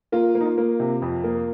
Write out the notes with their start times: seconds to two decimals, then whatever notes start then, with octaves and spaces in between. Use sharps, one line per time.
0.12 A#3 F4
0.35 A#3
0.40 D#4
0.45 F4
0.58 A#3
0.80 C3
1.02 F2
1.24 A#3